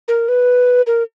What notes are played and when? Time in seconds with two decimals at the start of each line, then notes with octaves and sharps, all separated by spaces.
0.08 A#4
0.28 B4
0.87 A#4